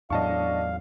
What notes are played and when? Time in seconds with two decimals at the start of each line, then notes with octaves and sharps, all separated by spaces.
0.10 E2 A2 F#3 D4 D#5 F5 A5 C#6